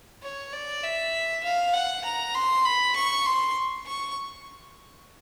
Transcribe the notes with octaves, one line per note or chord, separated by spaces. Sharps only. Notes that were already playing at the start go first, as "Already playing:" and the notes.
C#5
D5
E5
F5
F#5
A#5
C6
B5
C#6
C6
C#6